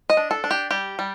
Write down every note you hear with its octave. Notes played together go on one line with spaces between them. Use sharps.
D#5
D4
A4
D4
G4
G3 G4
G3